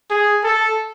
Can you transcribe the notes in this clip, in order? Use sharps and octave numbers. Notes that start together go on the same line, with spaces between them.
G#4
A4